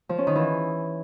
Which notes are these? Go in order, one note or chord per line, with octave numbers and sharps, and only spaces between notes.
F3
C#4
D#3
E3